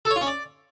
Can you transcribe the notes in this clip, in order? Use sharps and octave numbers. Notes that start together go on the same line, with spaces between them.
A4
C#5
F4
C#4
D5